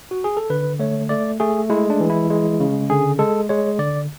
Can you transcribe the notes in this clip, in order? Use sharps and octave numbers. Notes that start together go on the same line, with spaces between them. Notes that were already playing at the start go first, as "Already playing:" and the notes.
F#4
G#4
A4
D3 B4
A3 C#5
A3 D5
A3 G#4
G#3 E4
D4
E3
E4
G#3
C#3
D3 G#4
G#3 A4
G#3 C#5
D3 D5